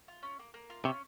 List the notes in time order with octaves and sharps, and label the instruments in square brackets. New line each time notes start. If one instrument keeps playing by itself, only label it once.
[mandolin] F4
C#4
A#3
A#3
F4
[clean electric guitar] C3 [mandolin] C#4